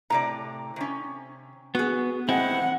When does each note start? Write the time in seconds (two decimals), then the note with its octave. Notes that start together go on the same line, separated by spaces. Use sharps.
0.10 A2 C3 D5 A#5
0.76 C3 C#4
1.75 B3 F#4 G#4
2.29 G#3 C4 E4 F#5